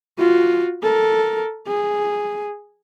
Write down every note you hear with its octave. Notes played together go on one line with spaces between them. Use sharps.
F4 F#4
A4 A#4
G#4